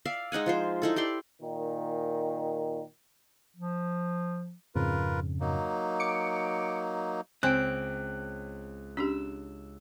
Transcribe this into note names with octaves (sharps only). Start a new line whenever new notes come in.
D5 E5 F5
G#3 D#4 F#5 G#5
F3 F4 C5
D#4 E4 A4
E4 G4 D5 C6
A#2 D#3
F3
F2 G#2 C#3 F4 A#4 B4
F#3 A#3 D#4
D6 C#7 D7
C#2 C4 G5 G#5 F#6 D7
C#4 D4 G4 E6